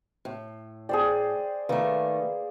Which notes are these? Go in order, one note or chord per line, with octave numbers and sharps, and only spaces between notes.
A2
G#4 C5 D5 G5
D#3 A3 A#3 B4